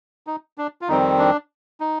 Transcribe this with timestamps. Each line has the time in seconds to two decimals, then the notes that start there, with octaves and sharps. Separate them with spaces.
0.27 D#4
0.58 D4
0.81 F4
0.88 F2 D#3 G3 C4 D#4
1.19 D4
1.80 D#4